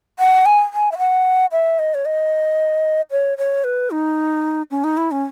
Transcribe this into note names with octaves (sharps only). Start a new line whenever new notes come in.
F#5
G#5
G#5
E5
F#5
E5
D#5
C#5
D#5
C#5
C#5
B4
D#4
C#4
D#4
E4
C#4